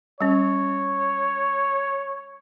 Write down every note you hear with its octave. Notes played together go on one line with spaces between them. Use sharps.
G3 C#4 C#5